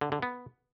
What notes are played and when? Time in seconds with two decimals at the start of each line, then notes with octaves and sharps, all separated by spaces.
0.01 D3
0.12 D3
0.22 B3